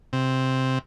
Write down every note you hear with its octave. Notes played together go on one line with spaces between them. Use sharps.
C3